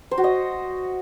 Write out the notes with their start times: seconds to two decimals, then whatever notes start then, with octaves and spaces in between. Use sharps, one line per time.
0.11 C5
0.18 F#4
0.24 D#5